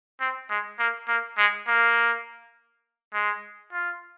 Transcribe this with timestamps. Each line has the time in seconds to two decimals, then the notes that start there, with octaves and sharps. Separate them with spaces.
0.20 C4
0.50 G#3
0.79 A#3
1.08 A#3
1.38 G#3
1.68 A#3
3.14 G#3
3.72 F4